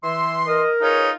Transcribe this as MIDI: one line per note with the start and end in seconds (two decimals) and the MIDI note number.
0.04 0.63 52
0.04 0.37 76
0.04 0.63 84
0.47 1.13 70
0.47 0.71 75
0.82 1.11 63
0.82 1.16 65
0.82 1.09 68
0.82 1.09 71
0.82 1.09 73